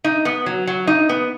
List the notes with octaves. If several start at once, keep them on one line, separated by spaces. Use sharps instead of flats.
D#4
B3
F#3
F#3
D#4
B3